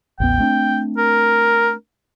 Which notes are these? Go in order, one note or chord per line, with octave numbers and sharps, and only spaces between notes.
A1 D#2 B3 G5
A3 C4 D4
A#4